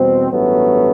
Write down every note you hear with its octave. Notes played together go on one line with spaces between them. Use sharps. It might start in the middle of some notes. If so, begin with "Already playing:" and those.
Already playing: E2 B2 G3 C4
A1 G2 F#3 A3 B3